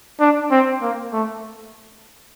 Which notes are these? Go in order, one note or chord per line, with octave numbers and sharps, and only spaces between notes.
D4
C4
A#3
A3